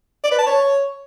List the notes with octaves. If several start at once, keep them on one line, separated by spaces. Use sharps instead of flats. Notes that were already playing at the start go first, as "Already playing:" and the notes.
D5
B4
A5
C#5